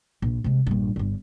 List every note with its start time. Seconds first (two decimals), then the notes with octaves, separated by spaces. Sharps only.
0.22 A#1
0.44 C3 G#3
0.66 A#1 G2
0.96 G1 D3